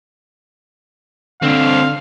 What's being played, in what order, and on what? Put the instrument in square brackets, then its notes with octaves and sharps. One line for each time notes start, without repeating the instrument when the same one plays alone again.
[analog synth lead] D3 [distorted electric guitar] C4 D4 [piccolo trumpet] F5